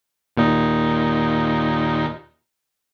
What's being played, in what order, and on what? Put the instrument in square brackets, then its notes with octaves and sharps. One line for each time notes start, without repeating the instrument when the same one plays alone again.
[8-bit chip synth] D#2 A#2 D#4